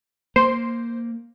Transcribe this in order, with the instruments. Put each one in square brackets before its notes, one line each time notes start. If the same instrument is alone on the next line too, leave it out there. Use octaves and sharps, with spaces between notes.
[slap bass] A#3 [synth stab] C5